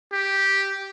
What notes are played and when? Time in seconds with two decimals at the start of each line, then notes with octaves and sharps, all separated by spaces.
0.13 G4